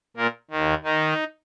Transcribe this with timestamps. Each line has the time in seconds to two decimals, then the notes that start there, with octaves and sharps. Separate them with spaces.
0.17 A#2 A#3
0.50 D#2 D#3
0.84 D#3 D#4